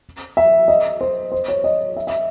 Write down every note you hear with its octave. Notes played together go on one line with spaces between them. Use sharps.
E5
D#5
C5
C5
C#5
D#5
E5
E5